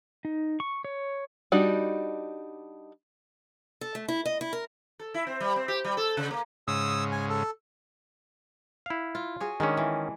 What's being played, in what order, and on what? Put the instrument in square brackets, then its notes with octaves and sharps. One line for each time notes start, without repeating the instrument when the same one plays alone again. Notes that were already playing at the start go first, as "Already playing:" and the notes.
[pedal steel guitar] D#4
C#6
C#5
[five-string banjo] G3 D4 D#4 F#4
[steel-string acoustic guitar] A4
A3
E4
D#5
E4
A#4
[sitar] A4
E4
C4
G3
C4
G4
G3
A4
C#3
A#3
[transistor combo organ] G#2 C#3 [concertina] D#6 E6
[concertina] G#5
A4
[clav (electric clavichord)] E4 F5
[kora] F4
F#4 G#4 C#5
[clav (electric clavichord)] D#3 C#4 [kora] G#3 D4
[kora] E3